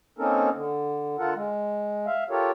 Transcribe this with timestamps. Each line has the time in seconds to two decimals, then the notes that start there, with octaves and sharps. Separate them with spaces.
0.19 A#3 C4 C#4 D#4 A4 A#4
0.54 D3
1.19 D3 F4 A4 A#4 F#5
1.35 G#3
2.06 E5 F5
2.30 F4 G4 A4 A#4 C#5